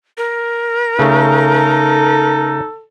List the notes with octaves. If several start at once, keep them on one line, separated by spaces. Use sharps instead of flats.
A#4
C#3 A3 D#4 A4